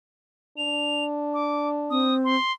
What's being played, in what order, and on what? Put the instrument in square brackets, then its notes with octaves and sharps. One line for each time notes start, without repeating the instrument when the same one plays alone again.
[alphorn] D4 [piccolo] F7
[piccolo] D6
[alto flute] C4 [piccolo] D#6
[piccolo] C6